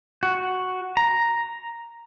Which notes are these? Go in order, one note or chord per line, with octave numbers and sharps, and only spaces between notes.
F#4
A#5